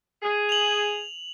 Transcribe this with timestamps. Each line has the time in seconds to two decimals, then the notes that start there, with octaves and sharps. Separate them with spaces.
0.23 G#4
0.49 F7 F#7